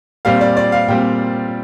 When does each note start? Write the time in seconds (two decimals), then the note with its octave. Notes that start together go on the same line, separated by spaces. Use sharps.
0.25 A#2 G3 C4 F5
0.41 D5
0.57 D5
0.72 F5
0.88 A#2 G3 C4 G5